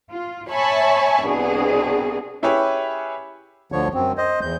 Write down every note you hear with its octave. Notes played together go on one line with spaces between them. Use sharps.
F4
C#5 E5 G#5 A5 B5 C#6
C2 B2 D4 G#4
C#4 E4 G4 G#4 B4 C#5
D2 D3 F3 C#5
F#2 C4
C5 D#5
E2 G6